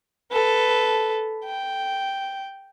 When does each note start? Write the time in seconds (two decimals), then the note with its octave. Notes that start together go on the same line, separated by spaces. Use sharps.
0.32 A4 B4
1.45 G5